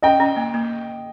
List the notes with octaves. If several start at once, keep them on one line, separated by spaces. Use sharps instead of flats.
C#4 D#5 G5
C#4
A#3
A#3